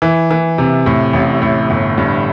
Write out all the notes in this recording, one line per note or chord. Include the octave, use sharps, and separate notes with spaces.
E3
E3
C3
A2
A1
A2
G1
G2